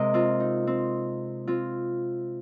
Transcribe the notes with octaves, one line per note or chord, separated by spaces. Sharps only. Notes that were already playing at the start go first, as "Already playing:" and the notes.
Already playing: C3 G#3 A#4 D#5
C4 F4
D#4
C4
C4 F4